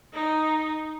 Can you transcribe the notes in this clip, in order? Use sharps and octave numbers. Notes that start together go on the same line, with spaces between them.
D#4